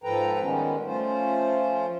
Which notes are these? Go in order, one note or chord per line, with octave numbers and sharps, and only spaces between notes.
G#2 F3 A4 B4 G5 A#5
D#3 G3 G#3 B3 C#4
F3 A3 C#4 F4 C5